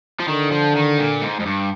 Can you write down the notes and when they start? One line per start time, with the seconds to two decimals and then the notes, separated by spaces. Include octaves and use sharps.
0.20 F3
0.28 D3 D#3
0.51 F3
0.75 D#3
0.98 A#2
1.22 G#2
1.40 F2
1.46 G2